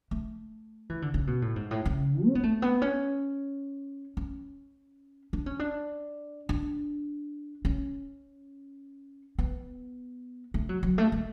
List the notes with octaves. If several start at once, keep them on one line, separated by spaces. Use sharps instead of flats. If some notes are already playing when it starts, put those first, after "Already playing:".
A3
E3
D3
C#3
B2
A2
G#2
A2
C#3
C#4
B3
A3
B3
C#4
C#4
D4
C#4
D4
D4
C#4
B3
A3
F#3
F#3
A3
G#3